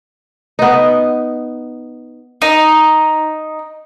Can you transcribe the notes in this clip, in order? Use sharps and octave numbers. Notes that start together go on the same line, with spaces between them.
B3 D#4
D#4